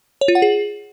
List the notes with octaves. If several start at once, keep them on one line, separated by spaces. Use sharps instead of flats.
C#5
F4
F#5
G#4